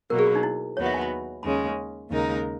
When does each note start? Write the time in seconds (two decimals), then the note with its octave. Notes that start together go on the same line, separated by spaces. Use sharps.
0.10 B2 F#3 A#3 A#4
0.19 G#4
0.27 F#4
0.35 D#4
0.43 E4
0.77 D#2 D#3 F#3 B3 F#4 C#5
0.86 E5
0.94 G#5
1.02 B5
1.43 D#2 C#3 G#3 C#4 B5
2.10 D#2 C#3 G#3 D#4 A#4